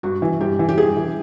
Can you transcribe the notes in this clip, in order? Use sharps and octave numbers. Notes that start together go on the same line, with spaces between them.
G2 F#4
E3
G2 G4
E3
G4
G2 G#4
E3